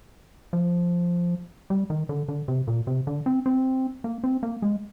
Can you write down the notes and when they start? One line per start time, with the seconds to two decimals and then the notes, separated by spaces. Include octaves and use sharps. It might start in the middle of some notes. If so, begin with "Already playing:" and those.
0.53 F3
1.70 G3
1.90 D#3
2.09 D3
2.28 D3
2.48 C3
2.68 A#2
2.87 C3
3.07 D3
3.26 C4
3.46 C4
4.04 A#3
4.24 C4
4.43 A#3
4.62 G#3